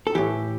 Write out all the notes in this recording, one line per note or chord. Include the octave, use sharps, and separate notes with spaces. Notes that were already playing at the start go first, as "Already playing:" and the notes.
A4
A2 E3 G4